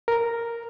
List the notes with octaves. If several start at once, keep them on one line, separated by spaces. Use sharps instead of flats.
A#4